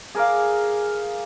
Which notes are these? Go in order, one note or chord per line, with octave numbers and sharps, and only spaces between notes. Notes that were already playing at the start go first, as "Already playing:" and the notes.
G#4 A#4 D5 F5